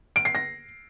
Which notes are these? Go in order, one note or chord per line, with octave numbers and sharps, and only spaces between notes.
D7
C7
A#6